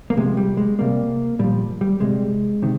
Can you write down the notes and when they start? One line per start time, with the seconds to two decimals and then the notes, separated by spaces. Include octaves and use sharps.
0.10 A#3
0.17 C3 F3 G#3
0.37 G3
0.57 G#3
0.79 C3 G3 A#3
1.39 A#2 F3 G3
1.81 G3
2.00 C3 G3 G#3
2.62 C3 D#3